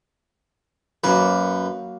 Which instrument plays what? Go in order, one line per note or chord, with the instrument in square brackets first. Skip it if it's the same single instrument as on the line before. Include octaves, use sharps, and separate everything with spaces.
[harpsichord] F#2 B4 [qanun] F#3 A#3